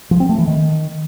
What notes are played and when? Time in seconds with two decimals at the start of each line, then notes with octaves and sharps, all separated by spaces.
0.11 F3
0.20 C4
0.29 A3
0.38 E3
0.48 D#3